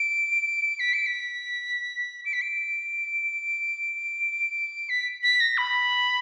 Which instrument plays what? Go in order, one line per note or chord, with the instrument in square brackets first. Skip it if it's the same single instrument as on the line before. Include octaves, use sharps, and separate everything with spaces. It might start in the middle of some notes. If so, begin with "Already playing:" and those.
Already playing: [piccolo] D7
B6
D7
B6
D7
B6
D7
B6
B6
A#6
B5